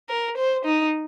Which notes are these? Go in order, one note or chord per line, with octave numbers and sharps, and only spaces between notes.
A#4
C5
D#4